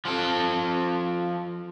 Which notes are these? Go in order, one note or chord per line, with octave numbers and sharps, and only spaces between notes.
F3 A4